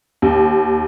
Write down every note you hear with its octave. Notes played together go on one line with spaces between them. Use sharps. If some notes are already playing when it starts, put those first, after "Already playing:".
D#2